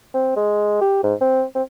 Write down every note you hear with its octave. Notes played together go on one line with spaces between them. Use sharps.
C4
G#3
G4
G#2
C4
C4